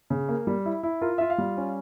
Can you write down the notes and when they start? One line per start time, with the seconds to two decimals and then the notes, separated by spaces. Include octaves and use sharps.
0.10 C#3
0.28 A#3
0.47 G3
0.65 E4
0.83 E4
1.01 F4 A#4
1.18 F4 E5
1.30 F5
1.38 G3
1.57 C#4